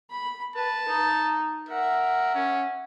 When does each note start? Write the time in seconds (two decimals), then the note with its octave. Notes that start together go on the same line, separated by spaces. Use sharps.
0.10 B5
0.56 B4 A5
0.88 D#4
1.69 A#4 E5 F#5
2.35 C#4